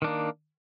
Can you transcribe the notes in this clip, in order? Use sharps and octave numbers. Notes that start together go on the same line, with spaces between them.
D#3 A#3 D4